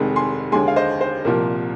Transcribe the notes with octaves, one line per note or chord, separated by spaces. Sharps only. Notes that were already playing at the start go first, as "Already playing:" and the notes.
Already playing: F1 F2 D#3 G#3
G#5 C6
D#2 D3 G#3 G#5 C6
F5
C5 D#5
C5
C2 A#2 F3 A#4